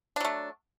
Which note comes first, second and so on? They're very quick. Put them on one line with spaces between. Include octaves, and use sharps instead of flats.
D4 F#3 A3